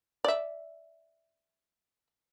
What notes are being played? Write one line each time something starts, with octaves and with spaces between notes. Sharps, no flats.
D5 E5